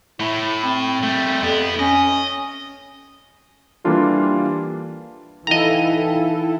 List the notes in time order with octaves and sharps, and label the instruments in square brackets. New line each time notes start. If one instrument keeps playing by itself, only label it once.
[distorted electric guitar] A2 [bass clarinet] E4
[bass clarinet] C4
[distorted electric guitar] G3 A3
[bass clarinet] F2 [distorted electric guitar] B3 E4
[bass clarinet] C#4 [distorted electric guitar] D#5
[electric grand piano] E3 G3 A#3 D4 F4 A4
[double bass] E3 [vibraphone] D#4 F5 G5 [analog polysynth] E4 A4 [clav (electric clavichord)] D#5 A#5